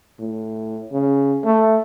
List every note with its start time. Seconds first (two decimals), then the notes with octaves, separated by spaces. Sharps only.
0.19 A2
0.92 C#3
1.44 A3